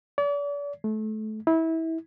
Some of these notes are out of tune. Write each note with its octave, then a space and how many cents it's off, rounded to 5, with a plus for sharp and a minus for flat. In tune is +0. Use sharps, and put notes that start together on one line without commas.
D5 -40
A3 -25
E4 -25